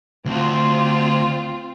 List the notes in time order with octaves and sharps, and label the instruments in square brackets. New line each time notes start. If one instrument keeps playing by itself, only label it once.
[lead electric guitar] D2 [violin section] C4 F4